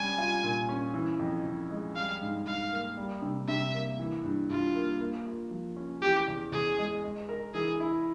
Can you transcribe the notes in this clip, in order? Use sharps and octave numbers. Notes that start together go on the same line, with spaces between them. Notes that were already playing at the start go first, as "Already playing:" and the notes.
Already playing: G3 C#4 G#5
F4
A#2
C#4
E3
F2
F2
G#3
G3 F5
G#2
G#2 F5
A#3
G3
C3
C3 E5
A#3
E3
G2
G2 F4
A#3
A#3
F4
F3
C#4
E3 G4
E2
E2 G#4
G#3
G#3
A#4
E3 G#4
E4